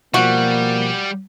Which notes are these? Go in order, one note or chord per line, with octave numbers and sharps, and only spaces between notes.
B2 F3 G3 A#3 F#4